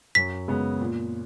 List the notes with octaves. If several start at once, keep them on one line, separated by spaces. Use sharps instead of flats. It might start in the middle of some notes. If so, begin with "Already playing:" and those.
F#2 B6
C#3 G#3 B3
A#2